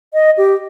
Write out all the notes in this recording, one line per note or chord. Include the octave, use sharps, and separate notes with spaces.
D#5
G4